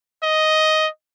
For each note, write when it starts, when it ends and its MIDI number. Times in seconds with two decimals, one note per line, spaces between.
0.23 0.88 75